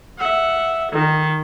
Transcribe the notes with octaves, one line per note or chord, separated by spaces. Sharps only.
E5 F#5
D#3